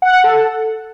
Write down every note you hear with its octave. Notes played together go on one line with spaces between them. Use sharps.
F#5
F#5
A4